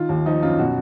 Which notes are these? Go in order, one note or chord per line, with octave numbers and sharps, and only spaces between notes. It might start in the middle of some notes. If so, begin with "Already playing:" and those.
Already playing: D#3 F4
D#2
F3 D#4
F#2 F4
B2 F#4